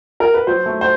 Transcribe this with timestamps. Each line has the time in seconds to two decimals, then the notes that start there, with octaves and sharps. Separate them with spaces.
0.20 A#4
0.34 B4
0.47 F#3 C5
0.66 A3
0.81 C5